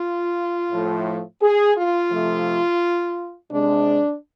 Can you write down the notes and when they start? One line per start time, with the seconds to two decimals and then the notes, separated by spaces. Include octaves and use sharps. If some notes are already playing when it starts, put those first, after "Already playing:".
Already playing: F4
0.72 A2 F3 A3
1.42 G#4
1.77 F4
2.11 C3 F3 A3
3.51 C3 G#3 D4